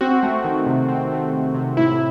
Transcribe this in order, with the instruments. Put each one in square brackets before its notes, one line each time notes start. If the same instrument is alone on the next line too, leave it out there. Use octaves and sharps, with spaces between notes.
[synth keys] C4 F#4
A3
D#3
C3
C4
A3
D#3
C3
A2 E4